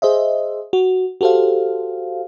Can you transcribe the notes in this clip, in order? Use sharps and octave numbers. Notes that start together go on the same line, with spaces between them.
G#4 C5 D#5 E5
F#4
F#4 G4 A4 C5 F5